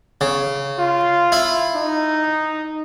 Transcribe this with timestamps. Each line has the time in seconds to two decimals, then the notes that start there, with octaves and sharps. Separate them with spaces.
0.21 C#3
0.79 F4
1.32 E4
1.75 D#4